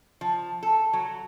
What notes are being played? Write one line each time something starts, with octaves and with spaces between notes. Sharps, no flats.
F3
A4
F#3